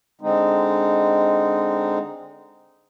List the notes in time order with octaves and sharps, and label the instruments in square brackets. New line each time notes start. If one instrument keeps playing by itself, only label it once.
[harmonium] D3 G#3 C4 D#4